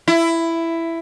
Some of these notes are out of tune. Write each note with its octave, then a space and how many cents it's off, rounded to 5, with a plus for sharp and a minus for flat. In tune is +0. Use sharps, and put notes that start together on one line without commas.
E4 +10